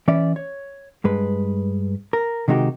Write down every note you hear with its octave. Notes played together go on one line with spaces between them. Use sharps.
E3 C#4 D5 E5
C#5
G2 G#3 B4
A#4
C3 D#3 G#3 D#4 F#4 G4